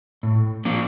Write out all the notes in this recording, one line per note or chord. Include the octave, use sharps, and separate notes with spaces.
A2
F3 A#3 D4